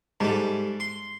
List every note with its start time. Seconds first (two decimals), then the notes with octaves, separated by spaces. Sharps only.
0.20 G#2 G3 A3
0.80 C6